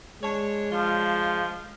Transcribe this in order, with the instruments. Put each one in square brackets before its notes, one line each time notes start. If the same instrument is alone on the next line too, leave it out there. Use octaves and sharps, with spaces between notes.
[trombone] G#3 [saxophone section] D4 C#5
[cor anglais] F3 [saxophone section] D4 F4